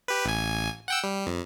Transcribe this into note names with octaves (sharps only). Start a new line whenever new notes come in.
G4 B4
A1 G#5
F#5 G5 E6
G3
F2